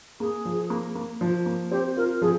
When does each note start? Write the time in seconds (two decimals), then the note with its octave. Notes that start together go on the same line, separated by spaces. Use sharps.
0.20 A#3 G#4
0.45 F3
0.70 A#3
0.95 A#3
1.21 F3
1.46 A#3
1.71 C4 G4
1.97 F4 A#4
2.22 F3 G#4